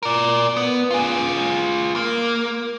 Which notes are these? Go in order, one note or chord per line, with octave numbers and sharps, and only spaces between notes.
A#4 D5
B3
F4 G#4
A#3